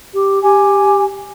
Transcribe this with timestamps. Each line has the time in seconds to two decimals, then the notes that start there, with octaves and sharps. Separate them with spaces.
0.14 G4
0.43 G4 G#5